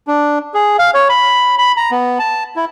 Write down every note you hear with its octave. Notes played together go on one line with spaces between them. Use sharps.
D4
G#4
F5
C#5
B5
B5
A#5
B3
A5
E4